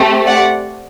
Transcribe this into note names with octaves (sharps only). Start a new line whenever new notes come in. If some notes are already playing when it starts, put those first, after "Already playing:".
Already playing: A3 C4 G4
D5 F#5